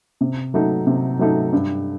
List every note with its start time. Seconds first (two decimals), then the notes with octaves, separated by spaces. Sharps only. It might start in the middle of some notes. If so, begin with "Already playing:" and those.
0.21 C3
0.54 F#3 A3 D#4
0.87 C3
1.19 F#3 A3 D#4
1.53 G2